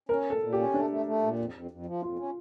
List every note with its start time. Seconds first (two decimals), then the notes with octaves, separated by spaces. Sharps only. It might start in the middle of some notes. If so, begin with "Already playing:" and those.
0.09 C#4 A#4
0.25 A#2
0.30 A4
0.41 A#2
0.52 G4
0.57 C#4
0.74 A3 D4
0.90 A3
1.06 A3
1.22 A#2
1.39 F2
1.54 F2
1.71 F2
1.86 F3
2.02 F2 F4
2.19 C#4